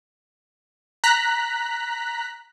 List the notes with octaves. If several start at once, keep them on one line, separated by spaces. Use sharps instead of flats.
A#5 F#6 B6